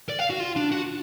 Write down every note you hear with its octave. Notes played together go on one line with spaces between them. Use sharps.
D5
F5
F#4
F4
D4
F#4